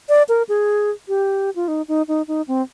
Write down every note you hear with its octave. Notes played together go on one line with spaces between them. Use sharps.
D5
A#4
G#4
G4
F4
D#4
D#4
D#4
D#4
C4